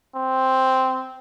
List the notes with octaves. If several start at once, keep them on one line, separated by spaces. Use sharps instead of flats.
C4